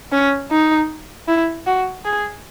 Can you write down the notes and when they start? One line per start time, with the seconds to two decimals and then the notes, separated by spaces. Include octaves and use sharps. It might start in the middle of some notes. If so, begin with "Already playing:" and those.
0.12 C#4
0.51 D#4
1.28 E4
1.67 F#4
2.05 G#4